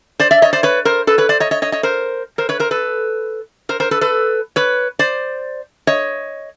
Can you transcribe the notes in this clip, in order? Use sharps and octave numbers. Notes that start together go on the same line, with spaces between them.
C5 D5
D5 E5
C#5 D#5
C5 D5
B4 C#5
A#4 C5
A4 B4
B4 C#5
C5 D5
C#5 D#5
C#5 D#5
C#5 D#5
C#5 D#5
A#4 C5
A#4 C5
B4 C#5
A#4 C5
A4 B4
A#4 C5
A#4 C5
A4 B4
A4 B4
B4 C#5
C5 D5
C#5 D#5